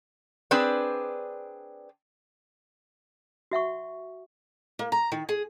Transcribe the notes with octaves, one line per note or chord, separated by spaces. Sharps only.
C4 D4 G#4 B4 D5
F#4 E5 F#5 C#6
A#3
A#5
D#3
G#4